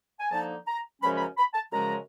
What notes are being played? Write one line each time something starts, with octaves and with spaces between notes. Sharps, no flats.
G#5
D3 F3 A#3 D#4 A5
A#5
F#2 C#3 F3 G#3 C#4 B5
B5
A#5
B5
A5
F#2 C#3 F3 G#3 C#4 A#5